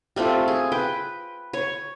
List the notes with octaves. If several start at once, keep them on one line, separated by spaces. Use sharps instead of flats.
G3 A3 C4 F4
G#4
B4 G5
C#5